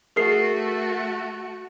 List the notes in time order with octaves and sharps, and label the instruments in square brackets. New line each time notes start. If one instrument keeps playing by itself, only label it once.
[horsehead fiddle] A3 F#4 [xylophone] G#4 A#4 C7